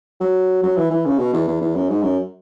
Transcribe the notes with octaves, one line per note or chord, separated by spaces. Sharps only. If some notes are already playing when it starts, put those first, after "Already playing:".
F#3
F#3
E3
E3
C#3
B2
E2
E2
E2
F#2
G#2
F#2